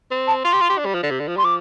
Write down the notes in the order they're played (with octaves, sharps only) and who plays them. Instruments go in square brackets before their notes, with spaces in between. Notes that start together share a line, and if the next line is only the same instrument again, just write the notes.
[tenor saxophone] C4
[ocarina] A5
[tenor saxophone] F4 [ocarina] C6
[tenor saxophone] G4
F4
G4
D4
G3
F3
D3
C3
D3
F3
[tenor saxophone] G3 [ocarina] C6
[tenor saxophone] F3 [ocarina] D6